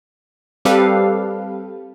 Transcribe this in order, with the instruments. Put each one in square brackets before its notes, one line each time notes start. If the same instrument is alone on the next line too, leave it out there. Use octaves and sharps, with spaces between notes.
[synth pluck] G3 C4 G4 A4 B4 F5